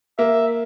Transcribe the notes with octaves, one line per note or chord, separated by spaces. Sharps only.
A#3 E5